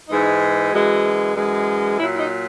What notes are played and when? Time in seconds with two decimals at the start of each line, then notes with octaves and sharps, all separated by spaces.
0.09 G#2 E3 G#3 D#4
0.72 F#2 E3 G#3 F#4
1.35 F#2 E3 G#3
1.98 A#2 F#3 E4
2.14 E4
2.19 D#4